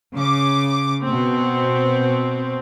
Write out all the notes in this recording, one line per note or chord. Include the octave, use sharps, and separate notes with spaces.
C#3 D6
B2 C4